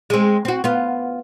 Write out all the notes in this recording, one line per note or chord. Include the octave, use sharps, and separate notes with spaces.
G#3 C4
C4 F#4
B3 F4